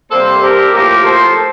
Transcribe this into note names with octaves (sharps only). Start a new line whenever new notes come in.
C3 G3 A#3 A4 C5
G4 A#4
A2 F3 A#3 G4 A#4
A4 C5